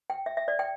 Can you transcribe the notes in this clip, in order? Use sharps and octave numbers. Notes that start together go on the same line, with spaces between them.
G5
E5
E5
D5
G5